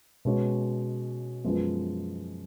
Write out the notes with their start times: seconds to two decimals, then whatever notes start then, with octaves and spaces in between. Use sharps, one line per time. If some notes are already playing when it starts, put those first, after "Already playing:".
0.25 B2 G#3 C#4 F#4 C#5
1.44 F#2 F3 G#3 B3